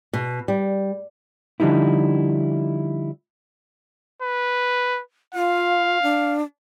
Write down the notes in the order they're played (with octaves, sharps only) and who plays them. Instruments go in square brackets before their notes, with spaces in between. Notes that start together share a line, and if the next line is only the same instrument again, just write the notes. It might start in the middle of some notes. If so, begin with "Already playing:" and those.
[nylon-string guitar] B2
G3
[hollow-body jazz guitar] D3 F3 G3 D#4 E4
[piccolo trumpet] B4
[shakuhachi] F4 [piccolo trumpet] F5
[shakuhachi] D4